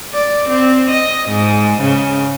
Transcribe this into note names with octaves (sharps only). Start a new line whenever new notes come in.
D5
C4
D#5
G#2
C#3